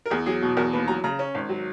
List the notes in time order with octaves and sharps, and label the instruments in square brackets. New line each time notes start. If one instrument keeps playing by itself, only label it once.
[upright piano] A#4
E2 G#4
F#3 G#4
B2
E2 A#4
D#2 B4
F#3 A#5
C#3 A#5
C#4
G#1
F#3